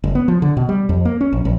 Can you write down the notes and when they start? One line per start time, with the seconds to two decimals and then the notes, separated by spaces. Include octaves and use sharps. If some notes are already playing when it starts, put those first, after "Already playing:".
0.04 F#1
0.15 B3
0.28 F3
0.42 D3
0.57 B2
0.69 G3
0.89 F2
1.05 A#3
1.21 C#4
1.33 A#1
1.45 A#1